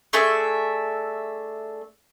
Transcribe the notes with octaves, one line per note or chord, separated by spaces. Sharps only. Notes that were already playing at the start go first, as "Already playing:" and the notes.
A3 D4 G#4 E5